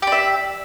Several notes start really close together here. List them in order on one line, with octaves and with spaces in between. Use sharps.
G4 D5 E5